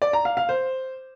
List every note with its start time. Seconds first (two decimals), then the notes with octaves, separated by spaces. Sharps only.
0.02 D5
0.13 A#5
0.25 F5
0.37 F5
0.49 C5